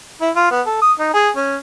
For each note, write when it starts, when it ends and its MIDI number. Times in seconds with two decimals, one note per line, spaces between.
0.21 0.30 64
0.36 0.50 65
0.51 0.61 59
0.66 0.81 69
0.81 0.92 87
0.99 1.09 63
1.14 1.29 68
1.36 1.56 61